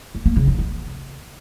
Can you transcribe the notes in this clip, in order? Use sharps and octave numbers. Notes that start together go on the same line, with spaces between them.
A#3
A#3
C#3
D#4
B3